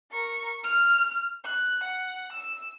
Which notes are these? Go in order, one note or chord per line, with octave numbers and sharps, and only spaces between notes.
A#4 C#6
F6
F#6
F#5
E6